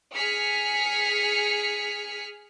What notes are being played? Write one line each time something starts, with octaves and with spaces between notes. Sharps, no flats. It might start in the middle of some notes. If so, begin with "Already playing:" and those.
G#4 F6 B6 C#7